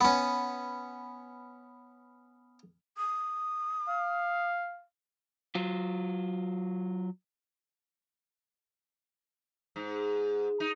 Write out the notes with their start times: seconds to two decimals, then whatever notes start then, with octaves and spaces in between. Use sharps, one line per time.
0.01 B3 C#4
2.97 D#6
3.88 F5
5.55 F#3 F4
9.76 G#2
10.60 D#4